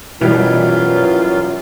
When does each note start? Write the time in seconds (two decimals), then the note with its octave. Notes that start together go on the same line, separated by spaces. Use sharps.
0.21 F#2 B2 E3 G3 F4